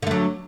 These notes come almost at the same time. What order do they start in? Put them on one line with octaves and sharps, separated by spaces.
D3 A3 F#3